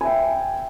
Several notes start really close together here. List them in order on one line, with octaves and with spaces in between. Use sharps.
G#5 E5 G5